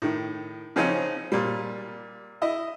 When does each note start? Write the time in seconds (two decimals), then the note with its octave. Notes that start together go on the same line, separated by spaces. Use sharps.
0.02 A2 D#3
0.76 C#3 F3 C4 C#4 D#4
1.32 A#2 G3
2.42 E4 D#5